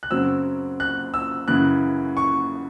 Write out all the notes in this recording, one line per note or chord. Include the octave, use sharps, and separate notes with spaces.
F#6
F#2 C#3 F#3 C4 E6
F#6
E6
F#2 C#3 E3 F#6
C#6